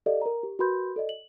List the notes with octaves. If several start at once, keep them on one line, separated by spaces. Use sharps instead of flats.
G4 A4 D5 D#5 F5
A#4 A#5
G4
F#4 A#4 B4 B5 C6 G6
A4 D5 D#5
F#7